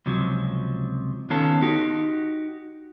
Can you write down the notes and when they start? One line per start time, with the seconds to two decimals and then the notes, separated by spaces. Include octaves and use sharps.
0.06 C#2 C3 F3 F#3
1.30 D#3 B3 C#4 F4 A4
1.62 D#4 F#4 G4